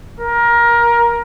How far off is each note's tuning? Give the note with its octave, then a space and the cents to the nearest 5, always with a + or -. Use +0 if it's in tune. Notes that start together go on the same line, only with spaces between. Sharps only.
A#4 +20